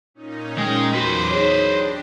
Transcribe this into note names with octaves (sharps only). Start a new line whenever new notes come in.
A#2 C#4 D#4
G#3 G5
E2 F#3 F#4 B4 C5 D6
D#4 G#4 C#5 D#5
D4 G4